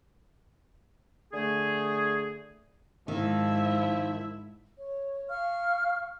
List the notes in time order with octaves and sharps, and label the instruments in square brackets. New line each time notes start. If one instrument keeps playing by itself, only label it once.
[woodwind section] D3 A3 G#4
[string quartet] G#2 [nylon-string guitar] D#3 [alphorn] F3 [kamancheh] E4 E5
[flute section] C#5
F5 C#6 F6